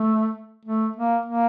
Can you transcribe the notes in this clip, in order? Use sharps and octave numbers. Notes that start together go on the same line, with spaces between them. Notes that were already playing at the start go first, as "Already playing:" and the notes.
Already playing: A3
A3
A#3
A#3